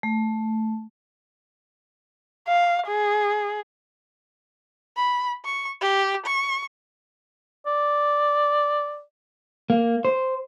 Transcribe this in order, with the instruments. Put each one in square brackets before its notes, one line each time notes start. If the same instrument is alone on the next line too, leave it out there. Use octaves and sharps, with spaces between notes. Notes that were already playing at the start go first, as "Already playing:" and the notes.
[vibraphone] A3
[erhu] F5
G#4
B5
C#6
G4
C#6
[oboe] D5
[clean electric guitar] A#3
C5